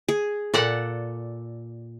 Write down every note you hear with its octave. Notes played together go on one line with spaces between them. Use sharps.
G#4
A#2 A4 D5 F#5